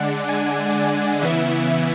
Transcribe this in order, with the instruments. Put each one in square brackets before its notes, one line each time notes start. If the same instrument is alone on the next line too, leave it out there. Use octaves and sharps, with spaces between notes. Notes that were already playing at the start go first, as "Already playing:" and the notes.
Already playing: [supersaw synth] D3 G#3 D4 D5 F#5
G#5
D5
C#3 E3 B3 E4 E5